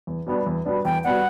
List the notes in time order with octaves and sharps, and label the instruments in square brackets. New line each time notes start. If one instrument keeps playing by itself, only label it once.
[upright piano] E2
B2 G3 B3 D4
E2
B2 G3 B3 D4
[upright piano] E2 [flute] G5
[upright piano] B2 G3 B3 D4 [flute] F#5